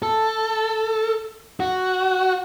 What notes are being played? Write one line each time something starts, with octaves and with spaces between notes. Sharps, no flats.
A4
F#4